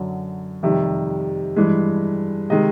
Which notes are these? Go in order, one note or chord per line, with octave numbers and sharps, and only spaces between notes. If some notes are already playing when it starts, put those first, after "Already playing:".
Already playing: F#2 D3 F#3
F2 C3 D#3 G3 E5
G2 E3 G#3
C3 D#3 G#3 D#5